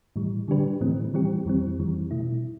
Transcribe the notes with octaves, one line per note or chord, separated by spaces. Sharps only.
A2 E3 G3
D3 G3 D4 G4 B4
A2 E3 A3 C4
E3 G3 C4 G4
F2 E3 G3 C4
F2 E3 G3
B2 A3 E4